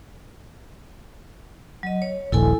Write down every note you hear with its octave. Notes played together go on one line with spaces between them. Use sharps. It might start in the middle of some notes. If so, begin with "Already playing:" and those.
F#3 D#5
C#5
D#1 A#1 E4 A4 G#5